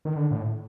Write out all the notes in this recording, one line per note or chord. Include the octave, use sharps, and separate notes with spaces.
D#3
D3
A2